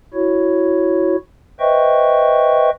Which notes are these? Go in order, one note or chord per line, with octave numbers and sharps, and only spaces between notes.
E4 F#4 C#5
B4 C5 D#5 E5 G5 C#6